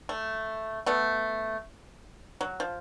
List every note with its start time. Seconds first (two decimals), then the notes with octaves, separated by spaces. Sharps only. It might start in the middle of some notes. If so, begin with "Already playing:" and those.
0.09 A3
0.86 A3 B3
2.41 F#3
2.60 F3